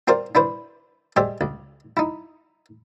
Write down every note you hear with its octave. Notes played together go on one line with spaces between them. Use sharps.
C4 F4 A#4 C5 D5
D4 E4 B4 C5
G#3 G4 C5 D5 E5
C#2
D#4 E4